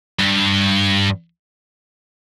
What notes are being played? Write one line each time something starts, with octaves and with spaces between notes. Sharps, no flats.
G2